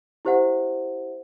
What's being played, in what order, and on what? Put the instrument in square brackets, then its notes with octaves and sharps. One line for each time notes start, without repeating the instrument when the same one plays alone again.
[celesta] E4 G4 C5 E5 F#5